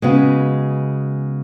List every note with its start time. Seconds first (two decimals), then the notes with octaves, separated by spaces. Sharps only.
0.02 C#3 G#3 B3 F#4 B4